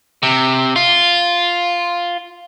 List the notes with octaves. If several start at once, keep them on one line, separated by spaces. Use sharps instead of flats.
C3
F4